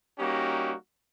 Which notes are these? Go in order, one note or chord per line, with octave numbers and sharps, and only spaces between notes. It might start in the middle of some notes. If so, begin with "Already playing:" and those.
G3 A#3 C#4 D#4 F#4 G4